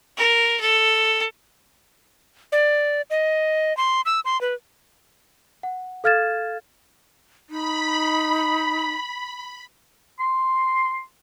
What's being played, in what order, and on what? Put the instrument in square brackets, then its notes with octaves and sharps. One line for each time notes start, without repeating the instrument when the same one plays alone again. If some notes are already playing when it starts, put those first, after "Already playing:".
[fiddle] A#4
A4
[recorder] D5
D#5
C6
E6
C6
B4
[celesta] F#5
A4 F5 F6 G#6 A6 E7
[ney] D#4 [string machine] B5
[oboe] C6